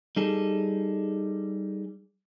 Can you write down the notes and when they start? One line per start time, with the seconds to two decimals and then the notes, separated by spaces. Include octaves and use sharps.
0.16 G3 D#4 G#4 A4